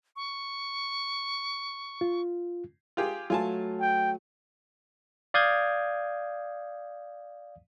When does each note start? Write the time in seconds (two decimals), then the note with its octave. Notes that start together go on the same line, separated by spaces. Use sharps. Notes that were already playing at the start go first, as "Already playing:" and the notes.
0.16 C#6
2.01 F4
2.97 F4 G4 G#4
3.30 F#3 A3 F4 G#5 A5
3.80 G5
5.34 D5 F5 D#6 G6 G#6